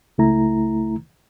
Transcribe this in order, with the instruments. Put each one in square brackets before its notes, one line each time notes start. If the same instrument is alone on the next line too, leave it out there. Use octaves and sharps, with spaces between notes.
[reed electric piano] C#2 A3 E4 A#5